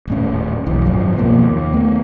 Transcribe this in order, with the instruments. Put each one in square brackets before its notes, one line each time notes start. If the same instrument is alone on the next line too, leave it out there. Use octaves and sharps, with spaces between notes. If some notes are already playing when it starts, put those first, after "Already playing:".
[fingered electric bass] D#1 A2 C#4
E1 B1 E3
G#1 F#2 F3
C2 B2 F3 A#3
D#2
A3 B3